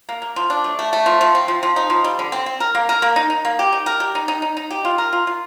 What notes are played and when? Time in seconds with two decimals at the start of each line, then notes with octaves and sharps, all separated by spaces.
0.09 A#3
0.22 A#3
0.36 F3
0.50 D4
0.64 A3
0.79 A3
0.93 A3
1.06 F3
1.21 F3
1.35 C4
1.48 F3
1.63 F3
1.76 D#4
1.90 F3
2.04 G3
2.19 D3
2.32 C4
2.46 C4
2.60 A#4
2.75 A#3
2.89 A#4
3.02 A#3
3.16 D#4
3.30 D#4
3.45 A#3
3.59 G4
3.73 D#4
3.86 A#4
4.00 G4
4.15 D#4
4.28 D#4
4.42 D#4
4.57 D#4
4.71 G4
4.85 F4
4.98 A#4
5.13 F4
5.27 F4